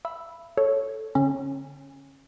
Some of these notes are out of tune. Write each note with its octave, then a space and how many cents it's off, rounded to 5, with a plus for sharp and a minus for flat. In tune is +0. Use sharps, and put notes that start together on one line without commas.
E5 +45 B5 +0 E6 +0
A4 +0 C#5 +0
D3 -30 C#4 -20